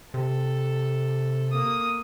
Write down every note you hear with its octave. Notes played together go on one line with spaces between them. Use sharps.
C3 A4
A#3 D#6